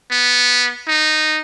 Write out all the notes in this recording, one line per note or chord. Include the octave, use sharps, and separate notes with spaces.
B3
D#4